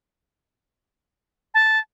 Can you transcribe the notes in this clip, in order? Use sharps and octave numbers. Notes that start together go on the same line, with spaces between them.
A5